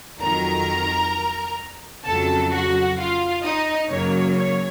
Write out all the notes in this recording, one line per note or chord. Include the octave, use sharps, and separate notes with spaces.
F2 D#3 F#3 A#4 A#5
F2 C#3 F#3 A4 A5
F#4 F#5
F4 F5
D#4 D#5
F#2 C#3 F#3 A#3 C#5
C#5